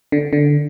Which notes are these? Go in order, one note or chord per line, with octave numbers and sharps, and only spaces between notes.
D3
D3